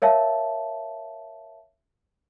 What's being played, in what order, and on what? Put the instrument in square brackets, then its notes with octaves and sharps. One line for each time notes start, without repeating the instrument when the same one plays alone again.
[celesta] A#4 C#5 E5 F5 A5